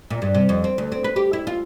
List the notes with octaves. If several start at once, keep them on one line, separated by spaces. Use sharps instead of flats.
A#2
G2
C3
F2
C4
D2
C4
B4
G4
E4
F4